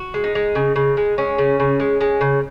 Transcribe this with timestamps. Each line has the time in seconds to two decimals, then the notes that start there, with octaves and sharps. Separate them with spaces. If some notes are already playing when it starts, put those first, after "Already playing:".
Already playing: F#4
0.14 G#3
0.24 D#4
0.35 G#3
0.55 C#3
0.76 C#3
0.97 G#3
1.18 G#3 C#4
1.38 C#3
1.60 C#3
1.80 G#3
2.01 G#3
2.21 C#3